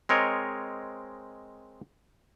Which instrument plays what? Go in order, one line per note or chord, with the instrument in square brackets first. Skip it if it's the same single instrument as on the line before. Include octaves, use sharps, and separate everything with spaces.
[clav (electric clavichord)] G#3 C4 A#4 C#5 D#5